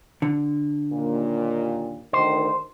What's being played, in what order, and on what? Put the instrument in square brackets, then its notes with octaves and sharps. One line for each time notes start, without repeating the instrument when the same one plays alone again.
[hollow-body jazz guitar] D3
[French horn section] D#2 A#2
[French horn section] D2 D#3 [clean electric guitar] C5